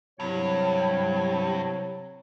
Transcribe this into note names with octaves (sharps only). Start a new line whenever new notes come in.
G2 C3 F#3 E4 C#5